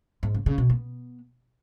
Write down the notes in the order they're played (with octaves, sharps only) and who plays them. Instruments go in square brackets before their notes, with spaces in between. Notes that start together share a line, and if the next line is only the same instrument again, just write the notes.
[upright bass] G#2
C#3
C#3
B2
B3